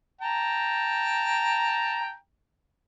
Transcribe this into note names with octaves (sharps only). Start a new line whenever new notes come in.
G5 A5 A#5